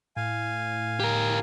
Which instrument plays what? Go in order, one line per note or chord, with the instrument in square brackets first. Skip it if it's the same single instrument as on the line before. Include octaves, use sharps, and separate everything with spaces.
[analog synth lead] A2 [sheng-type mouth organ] F5 G#5
[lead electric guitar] G4 A#4